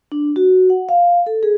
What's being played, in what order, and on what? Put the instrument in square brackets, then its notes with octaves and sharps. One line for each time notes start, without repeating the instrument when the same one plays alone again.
[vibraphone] D4
F#4
F#5
F5
A4
G#4